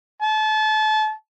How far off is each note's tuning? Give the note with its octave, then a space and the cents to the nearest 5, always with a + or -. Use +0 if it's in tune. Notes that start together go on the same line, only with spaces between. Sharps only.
A5 -30